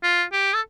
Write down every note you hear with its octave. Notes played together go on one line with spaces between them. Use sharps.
F4
G4
A4